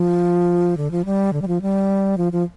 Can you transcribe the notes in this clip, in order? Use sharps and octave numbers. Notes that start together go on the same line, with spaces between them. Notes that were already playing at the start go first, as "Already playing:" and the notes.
Already playing: F3
D3
F3
G3
D3
G3
F3
G3
F3
F3